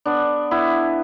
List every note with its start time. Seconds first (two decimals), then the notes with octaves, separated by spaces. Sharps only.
0.05 B3 D4
0.51 B3 E4